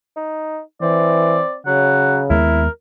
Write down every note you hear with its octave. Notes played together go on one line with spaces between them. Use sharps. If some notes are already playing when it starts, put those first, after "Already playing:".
D#4
E3 C4 D5
C#3 F#3 F#5
D#2 G#3 B3 E4 A#4